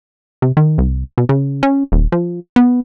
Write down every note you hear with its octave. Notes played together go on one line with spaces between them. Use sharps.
C3
D#3
C2
B2
C#3
C#4
D#1
F3
B3